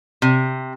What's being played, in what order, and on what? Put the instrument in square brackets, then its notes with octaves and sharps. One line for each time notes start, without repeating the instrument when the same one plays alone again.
[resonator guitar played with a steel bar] C3